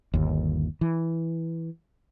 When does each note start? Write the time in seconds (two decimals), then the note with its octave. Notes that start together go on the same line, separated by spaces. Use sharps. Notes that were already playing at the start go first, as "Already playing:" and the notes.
0.14 G1 D#2
0.81 E3